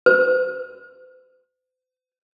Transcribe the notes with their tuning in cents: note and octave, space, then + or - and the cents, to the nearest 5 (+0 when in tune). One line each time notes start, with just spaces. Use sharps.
C5 -45